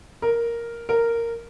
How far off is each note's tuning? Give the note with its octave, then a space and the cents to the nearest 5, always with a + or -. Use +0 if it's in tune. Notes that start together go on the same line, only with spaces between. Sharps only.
A#4 +0
A#4 -10